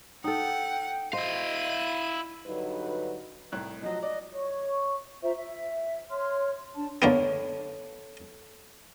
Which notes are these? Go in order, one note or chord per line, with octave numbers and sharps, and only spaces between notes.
D#4 A4 F#5 G5
E4 C5 D#5 F5 D#7
G2 D3 F#3 D#4 B4
C2 A2 F#6
F3 F#3 D#5
D5 D#5
C#5 C#6
F4 C5 E5 A#5
E5
C#5 C6 F6
D4 A5
D3 A#3 B3 A4 C#5